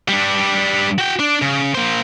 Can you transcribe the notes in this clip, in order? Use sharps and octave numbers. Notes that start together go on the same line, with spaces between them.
G3 D4
F#4 G5
D4
C#3
A#3 C5